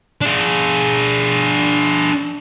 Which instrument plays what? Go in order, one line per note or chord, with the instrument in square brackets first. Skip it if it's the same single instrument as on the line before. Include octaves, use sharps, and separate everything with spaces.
[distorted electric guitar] D4 G#4